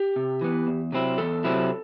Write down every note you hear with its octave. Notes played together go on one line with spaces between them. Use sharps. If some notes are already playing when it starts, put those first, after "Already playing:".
Already playing: G4
C3
E3 B3
E2
C3 F#3 C4 E4
E2 A4
C3 F#3 C4 E4